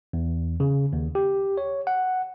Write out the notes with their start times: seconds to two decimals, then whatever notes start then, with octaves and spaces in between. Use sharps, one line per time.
0.13 E2
0.60 C#3
0.93 D#2
1.15 G4
1.58 C#5
1.87 F#5